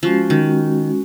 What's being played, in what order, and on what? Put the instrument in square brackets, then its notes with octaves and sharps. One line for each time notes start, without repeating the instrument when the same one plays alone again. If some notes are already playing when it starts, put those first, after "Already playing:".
[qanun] F3 [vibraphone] G#3 C#4 F#4
[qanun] D#3